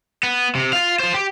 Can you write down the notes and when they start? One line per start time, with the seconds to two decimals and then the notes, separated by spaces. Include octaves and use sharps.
0.23 B3
0.55 C3
0.73 F4 F5
1.00 F4 C5
1.14 G4